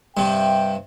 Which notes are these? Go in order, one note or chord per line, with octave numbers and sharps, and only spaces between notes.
G2 C3 G5